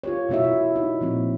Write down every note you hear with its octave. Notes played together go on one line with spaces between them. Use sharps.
F4 G4 C#5
B2 A3 E4 F#4 E5
E4
D#4
A#2 F3 A#3 C4